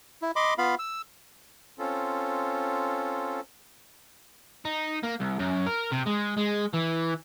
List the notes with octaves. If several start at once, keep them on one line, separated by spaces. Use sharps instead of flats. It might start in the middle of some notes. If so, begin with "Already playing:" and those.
E4
D#5 B5 C6 D6
B3 F4 F5 B5
E6
C4 C#4 F4 A4
D#4
A#3
C2
F#2
A#4
C3
G#3
G#3
E3